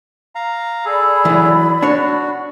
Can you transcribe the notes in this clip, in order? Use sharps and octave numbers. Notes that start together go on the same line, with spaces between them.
F5 A#5
G#4 A4 D5 B5
E3 F#3
D4 F#4 C#5